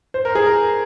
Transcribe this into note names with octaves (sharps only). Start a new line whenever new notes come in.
C5
A#4
G#4
A#4